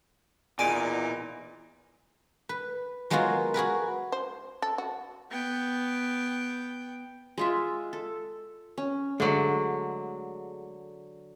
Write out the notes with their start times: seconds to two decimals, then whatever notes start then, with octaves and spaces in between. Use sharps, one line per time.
0.59 E2 A#2 D#4 D5 G#5 D6
2.49 B4
3.10 F#3 G#3 A#3 B3 F4 F#4
3.54 F#4 G#4 A#4 B4
4.12 C5
4.62 A4
4.78 F#4
5.30 B3 G5
7.38 G#3 F4 E5
7.93 A4
8.78 C#4
9.20 D3 F#3 G#3 A3